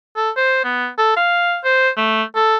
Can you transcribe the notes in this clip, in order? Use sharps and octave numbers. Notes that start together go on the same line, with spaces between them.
A4
C5
B3
A4
F5
C5
A3
A4